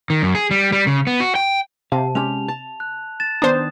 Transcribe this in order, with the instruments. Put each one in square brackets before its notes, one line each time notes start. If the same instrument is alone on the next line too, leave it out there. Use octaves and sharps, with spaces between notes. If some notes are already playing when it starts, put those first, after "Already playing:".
[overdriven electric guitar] D#3
F#2
G#4
G3
G3
C#3
B3
F#4
G5
[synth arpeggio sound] C3 [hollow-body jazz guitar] F5 [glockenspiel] A5
[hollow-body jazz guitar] G#3 C#4 G4 [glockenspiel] F7
[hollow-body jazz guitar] A5
[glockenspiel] F#6
A6 E7
[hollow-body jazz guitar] D#3 B3 A#5 [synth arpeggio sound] D4 C5 [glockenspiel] D#6